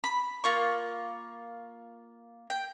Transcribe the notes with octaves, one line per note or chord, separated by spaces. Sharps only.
B5
A#3 F4 C#6
G5